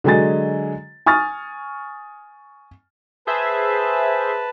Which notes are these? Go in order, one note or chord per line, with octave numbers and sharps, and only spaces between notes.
D3 F#3 G#3 D#5 G#5 A6
G#5 C#6 D#6 F6 A6
G#4 B4 C5 E5 A5